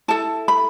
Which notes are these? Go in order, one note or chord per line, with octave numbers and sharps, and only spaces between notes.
E4 A4 A5
B5